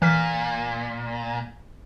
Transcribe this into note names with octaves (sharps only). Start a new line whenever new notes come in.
A#2 E3 F6 B6